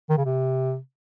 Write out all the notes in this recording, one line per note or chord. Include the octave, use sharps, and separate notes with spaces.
D#3
C#3
C3